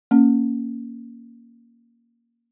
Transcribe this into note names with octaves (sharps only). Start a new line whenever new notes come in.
A#3 C#4